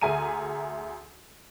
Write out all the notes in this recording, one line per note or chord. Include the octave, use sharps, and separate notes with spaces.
D2 G#4 E5 G#5 A#5 D#7